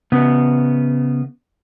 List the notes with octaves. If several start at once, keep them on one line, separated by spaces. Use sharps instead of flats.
C#3 B3